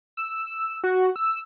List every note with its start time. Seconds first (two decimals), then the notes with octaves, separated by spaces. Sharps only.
0.17 E6
0.84 F#4
1.16 E6